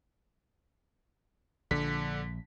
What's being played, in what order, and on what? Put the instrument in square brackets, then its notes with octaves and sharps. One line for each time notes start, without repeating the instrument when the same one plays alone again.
[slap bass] A#1 [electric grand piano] D3 B6